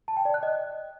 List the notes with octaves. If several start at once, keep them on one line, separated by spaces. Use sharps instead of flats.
A5
G5
D5
F#6
D#5